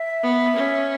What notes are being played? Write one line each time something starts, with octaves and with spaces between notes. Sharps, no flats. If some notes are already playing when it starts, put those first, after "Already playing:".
Already playing: E5
B3
C#4